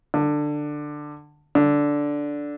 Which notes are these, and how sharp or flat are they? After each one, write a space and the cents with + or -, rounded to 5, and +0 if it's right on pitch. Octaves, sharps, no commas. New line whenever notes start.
D3 +15
D3 -5